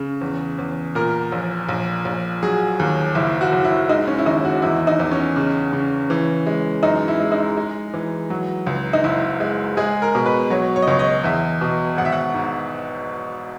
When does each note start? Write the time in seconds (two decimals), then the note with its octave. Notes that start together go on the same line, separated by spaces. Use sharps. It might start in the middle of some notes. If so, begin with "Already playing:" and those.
Already playing: C#3
0.21 E2
0.58 E2
0.95 A#2 A#4
1.32 A#1
1.69 A#1
2.05 A#1
2.43 F#3 G#4
2.79 D#2
3.15 F#1 E4
3.41 F#4
3.52 F#1
3.65 E4
3.89 G#3 D#4
4.08 C#4
4.19 E4
4.26 D#2 D#4
4.45 F#4
4.62 E2 E4
4.87 D#4
5.00 E2
5.12 C#4
5.36 C#3
5.73 C#3
6.10 E3
6.47 G#3
6.83 F#2 D#4
7.08 E4
7.20 G#3
7.32 D#4
7.57 G#3
7.94 E3
8.30 F#3
8.66 C#2
8.93 D#4
9.04 F#1 E4
9.40 G#3
9.77 G#3 G#4
10.02 A#4
10.15 B2
10.26 B4
10.50 F#3 C#5
10.76 C#5
10.82 D#5
10.87 C#2 C#5
10.99 D#5
11.24 E2 E5
11.61 B2
11.97 G#1 F#5
12.05 E5
12.12 F#5
12.34 G#2